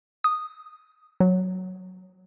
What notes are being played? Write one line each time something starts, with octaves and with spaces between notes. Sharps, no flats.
D#6
F#3